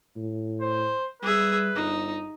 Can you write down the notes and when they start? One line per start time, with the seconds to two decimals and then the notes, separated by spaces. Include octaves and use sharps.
0.16 A2
0.61 C5
1.22 G3 G#4 B4 E5
1.75 G1 D#4